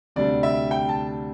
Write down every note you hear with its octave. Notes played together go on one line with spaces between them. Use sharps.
D2 C3 G3 D4 D5
E5
G5
A5